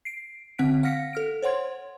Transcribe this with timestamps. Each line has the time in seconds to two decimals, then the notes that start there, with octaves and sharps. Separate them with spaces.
0.05 C7 D7
0.58 D3 C4 F#5 F#6 B6 D7
0.83 F5 F#5 F6 A#6 B6 C#7
1.13 A4 F6 D7
1.42 C5 C#5 F#5 C6 G#6